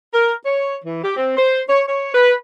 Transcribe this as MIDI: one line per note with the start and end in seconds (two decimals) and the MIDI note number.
0.13 0.33 70
0.44 0.77 73
0.85 1.01 52
1.04 1.16 67
1.16 1.34 60
1.37 1.60 72
1.69 1.81 73
1.88 2.13 73
2.14 2.34 71